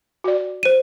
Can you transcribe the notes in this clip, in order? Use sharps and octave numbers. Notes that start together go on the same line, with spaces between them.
F#4 D5
C5 D#7